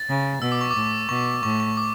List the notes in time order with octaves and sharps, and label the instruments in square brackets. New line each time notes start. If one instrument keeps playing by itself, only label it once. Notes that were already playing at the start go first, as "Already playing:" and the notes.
Already playing: [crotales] A6
[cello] C#3
[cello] B2 [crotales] E6
[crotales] D6
C#6
D6
[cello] A2
[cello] B2 [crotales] C#6
[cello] A2 [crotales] C#6
[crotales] C#6
D6